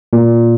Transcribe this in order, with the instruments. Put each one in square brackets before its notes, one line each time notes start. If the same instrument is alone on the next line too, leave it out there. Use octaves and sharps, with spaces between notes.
[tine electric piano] A#2